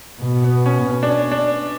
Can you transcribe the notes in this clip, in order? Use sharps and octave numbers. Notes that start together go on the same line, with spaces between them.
B2
B3
C#4
C#4
D4
C#4
D4